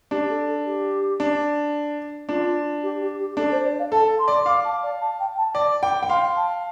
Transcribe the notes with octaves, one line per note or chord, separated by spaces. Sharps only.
D4 G4
A4
A4
G4
D4
D4 F4
G4
G4
G4
D4 A4
C5
D5
F5
A4 A5
C6
D5
F5 D6
A5
D5
A5
G5
A5
D5 D6
G5
G5
F5 C6
A5